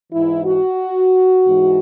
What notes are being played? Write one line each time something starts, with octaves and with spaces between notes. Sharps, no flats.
G#2 E3 E4
F#4
G#2 E3